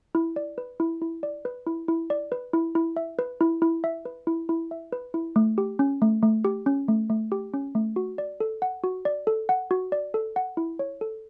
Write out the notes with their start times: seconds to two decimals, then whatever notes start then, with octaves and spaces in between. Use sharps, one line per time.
0.15 E4
0.36 D5
0.58 B4
0.80 E4
1.02 E4
1.23 D5
1.45 B4
1.67 E4
1.88 E4
2.10 D5
2.32 B4
2.53 E4
2.75 E4
2.97 E5
3.19 B4
3.41 E4
3.62 E4
3.84 E5
4.05 B4
4.27 E4
4.49 E4
4.71 E5
4.92 B4
5.14 E4
5.36 A3
5.58 G4
5.79 C#4
6.02 A3
6.23 A3
6.45 G4
6.66 C#4
6.88 A3
7.10 A3
7.32 G4
7.54 C#4
7.75 A3
7.96 F#4
8.18 D5
8.40 A4
8.62 F#5
8.84 F#4
9.05 D5
9.27 A4
9.49 F#5
9.71 F#4
9.92 D5
10.14 A4
10.36 F#5
10.57 E4
10.79 C#5
11.01 A4